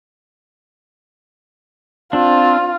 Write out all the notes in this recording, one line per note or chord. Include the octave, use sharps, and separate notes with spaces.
C4 D4 F4